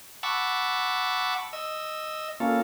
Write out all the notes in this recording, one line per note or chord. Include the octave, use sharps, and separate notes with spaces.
F#5 A5 B5 C#6 D6 E6
D#5 E6
A#3 C#4 F4 A4